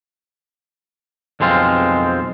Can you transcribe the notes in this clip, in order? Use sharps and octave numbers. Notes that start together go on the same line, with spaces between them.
B1 F2 G#3 C4 F4